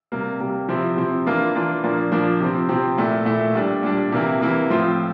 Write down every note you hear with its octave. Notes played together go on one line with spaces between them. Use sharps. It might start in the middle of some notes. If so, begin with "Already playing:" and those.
C3 G3 A#3
C3 G3 A#3
C3 F3 C4 E4
C3 F3 C4 E4
E3 A#3 D4 F4
E3 A#3 D4 F4
A#2 F3 A#3 D4
A#2 F3 A#3 D4
C3 F3 C4
C3 F3 C4
A#2 A3 E4
A#2 A3 E4
A#2 G3 D4
A#2 G3 D4
C3 E3 A#3 E4
C3 E3 A#3 E4
A2 F3 C4 F4